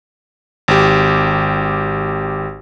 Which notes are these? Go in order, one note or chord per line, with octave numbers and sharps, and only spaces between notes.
G#1 G4